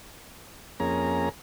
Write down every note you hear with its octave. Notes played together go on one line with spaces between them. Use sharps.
F2 A#3 C#4 G#4 A#5